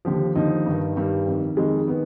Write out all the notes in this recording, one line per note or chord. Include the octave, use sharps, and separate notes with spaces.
D#2 D3 F3 G4
D#2 D3 F3 D#4
G2 D#3
G2 D#3 G3
F2 D#3
F2 D#3 G#3
D#3 B3